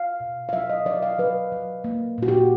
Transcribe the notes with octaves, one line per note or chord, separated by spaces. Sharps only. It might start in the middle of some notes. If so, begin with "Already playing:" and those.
Already playing: F5
B2
F5
F#3 E5
D#5
F#3 D5
F5
F#3 B4
F#3
A#3
A#2 F#4
G4